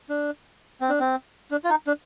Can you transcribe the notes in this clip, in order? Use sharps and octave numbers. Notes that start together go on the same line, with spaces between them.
D4
C4
D4
C4
D4
F4
D#4
D4